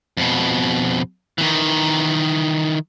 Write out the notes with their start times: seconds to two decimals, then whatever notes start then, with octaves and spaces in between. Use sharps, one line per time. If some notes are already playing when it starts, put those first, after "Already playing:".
0.17 F2 B2
1.38 D#3 E3